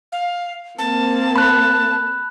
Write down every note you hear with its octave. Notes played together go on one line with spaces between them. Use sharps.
F5
A#3 C4 A5
B5 F#6